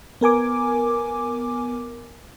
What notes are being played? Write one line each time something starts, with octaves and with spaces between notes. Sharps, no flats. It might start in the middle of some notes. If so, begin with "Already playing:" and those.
B3 A#4 G#5 D6